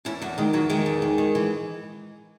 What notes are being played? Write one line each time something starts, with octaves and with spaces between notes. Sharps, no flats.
E2 C#4 E4
E2 F#3
D#3 G#3
E2 F#3
D#3 G#3
E2
D#3
D#3
E3